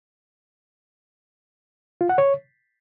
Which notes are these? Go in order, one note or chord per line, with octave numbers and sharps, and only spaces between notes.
F4
F#5
C#5